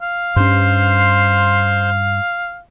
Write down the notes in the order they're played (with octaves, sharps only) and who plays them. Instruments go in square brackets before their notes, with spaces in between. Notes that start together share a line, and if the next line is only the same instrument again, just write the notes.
[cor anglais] F5
[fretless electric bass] G2 C#4 [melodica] C5 C6